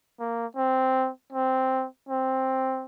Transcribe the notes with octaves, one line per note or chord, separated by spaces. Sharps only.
A#3
C4
C4
C4